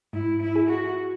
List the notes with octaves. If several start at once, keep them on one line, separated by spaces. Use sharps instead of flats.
G#2 E4
E4
G#4
F#4